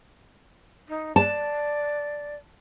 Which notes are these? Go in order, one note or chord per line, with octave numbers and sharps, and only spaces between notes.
D#4
D5 A5